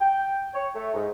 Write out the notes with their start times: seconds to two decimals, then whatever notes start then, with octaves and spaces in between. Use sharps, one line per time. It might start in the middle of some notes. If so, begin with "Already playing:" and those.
0.01 G5
0.54 C#5
0.75 A3
0.94 G#2